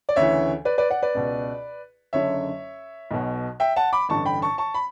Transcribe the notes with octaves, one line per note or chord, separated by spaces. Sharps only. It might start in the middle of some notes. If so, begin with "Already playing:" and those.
D5
D2 C#3 E3 C#5 E5
B4 D5
B4 D5
D5 F#5
B4 D5
C#2 B2
F#1 F#2 D3 C#5 E5
B1 B2
E5 G5
F#5 A5
B5 D6
A1 G2 D3 A5 C#6
G5 B5
A5 C#6
A5 C#6
B5